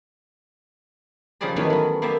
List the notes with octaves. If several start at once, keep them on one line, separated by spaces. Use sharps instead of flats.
C#3 F3 G3 G#4 D5 A#5
D#3 E3 F#3 A3 B3 C#4
F#3 B3
A#3 B3 G4 E5 A5